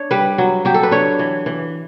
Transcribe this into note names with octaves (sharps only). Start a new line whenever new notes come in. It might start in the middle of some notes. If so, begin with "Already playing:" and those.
Already playing: D4 C#5
G3 B4
F#3
F#3 G4
A4
B4
D4 C#5
E3
E3